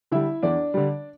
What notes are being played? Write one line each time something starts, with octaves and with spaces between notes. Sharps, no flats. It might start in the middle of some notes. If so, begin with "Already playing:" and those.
D3 G3 E4 E5
E2 D4 D5
D3 G3